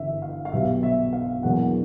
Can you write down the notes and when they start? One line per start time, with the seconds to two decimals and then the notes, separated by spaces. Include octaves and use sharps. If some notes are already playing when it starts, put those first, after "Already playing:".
Already playing: G1 G2 E3 E5
0.22 F5
0.45 F5
0.52 B1 B2 G3 B3 E5
0.83 E5
1.13 F5
1.43 E1 E2 B2 F#3 A#3 F#5